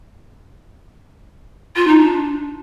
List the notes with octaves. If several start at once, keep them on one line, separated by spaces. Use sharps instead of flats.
F4
D#4
D4